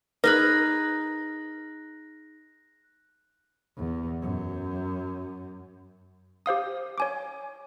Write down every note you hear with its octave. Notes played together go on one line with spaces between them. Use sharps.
D#4 G#4 B4 B5 F#6 A#6
E2
F#2
G4 C5 F5 D#6
C#5 G#5 D6